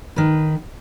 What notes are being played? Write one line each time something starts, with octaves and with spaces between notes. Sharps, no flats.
D#3 B4